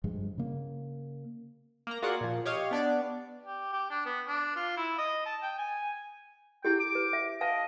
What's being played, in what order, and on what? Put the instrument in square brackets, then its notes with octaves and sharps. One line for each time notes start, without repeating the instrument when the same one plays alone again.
[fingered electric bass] G2 F3 G#3
C#3 A#3
[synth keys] A#3 A#5
A#3 F4 F#4 G#4 D5 F#5
A#2 F3
G4 C#5 D#5 F5
B3 D4 D5
[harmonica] G4
G4
D4
B3
D4
F4
E4
D#5
A5
G5
G#5
[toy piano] E4 G4 G#4 [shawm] G5
[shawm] D6
[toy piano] B4
E5
[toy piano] B4 F5 A5 [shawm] D#5